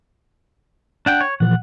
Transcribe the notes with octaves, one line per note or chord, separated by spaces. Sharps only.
D4 F#5 G5
C#5
A#2 E3 F3 F#5